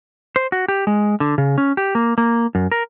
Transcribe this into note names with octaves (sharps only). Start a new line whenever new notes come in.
C5
F#4
G4
G#3
D3
C#3
C#4
G4
A#3
A#3
F#2
A#4